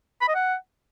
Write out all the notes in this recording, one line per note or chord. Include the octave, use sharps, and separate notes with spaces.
B5
D#5
F#5